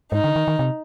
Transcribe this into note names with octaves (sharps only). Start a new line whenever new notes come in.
G#2 D#4
D3
D#3
D#3
C3